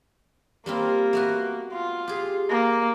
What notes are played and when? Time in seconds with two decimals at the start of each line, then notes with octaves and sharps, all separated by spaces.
0.66 G3 A#3 C4 F4
1.13 A3 B3 F#4
1.72 F4
2.08 G4 G#4
2.49 A#3